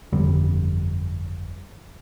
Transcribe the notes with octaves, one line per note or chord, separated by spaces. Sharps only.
G1 F2 D3 G3